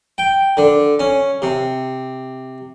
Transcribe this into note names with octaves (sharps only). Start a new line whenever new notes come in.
G5
D3
C#4
C3